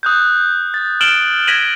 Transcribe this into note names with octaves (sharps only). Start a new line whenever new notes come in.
D#6 F#6 G6
A6
F6 A6 D7 E7 F#7 G7
G#6 A#6 B6 D#7 E7 F#7